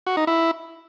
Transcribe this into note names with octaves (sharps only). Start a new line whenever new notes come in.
F#4
D#4
E4